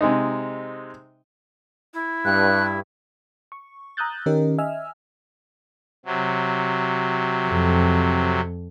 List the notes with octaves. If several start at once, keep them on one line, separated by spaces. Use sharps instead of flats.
C3 G#3 D#4
E4
G2 F#6
C#6
A#5 D#6 E6 F#6 G6 A6
D#3 C#4 G4 A#4 D#5
D#5 E5 G#5 E6 F6
C3 F#3
F2